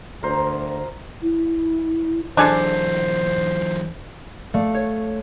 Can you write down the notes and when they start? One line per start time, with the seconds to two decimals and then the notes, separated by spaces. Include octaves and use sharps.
0.23 D2 A#4 C5
1.22 E4
2.37 E3 F#3 D4 G#4 A4 C5
4.54 A3 D5 F5
4.74 C#5